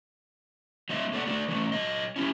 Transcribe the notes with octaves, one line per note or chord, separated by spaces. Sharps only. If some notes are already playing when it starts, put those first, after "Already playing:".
F#3 A#3 D#5 E5
A#3 A4 B4 D5 F#5
A3 D4 F#4 A4 D5
E3 F#3 A3
F#3 D#5
C#4 E4 G4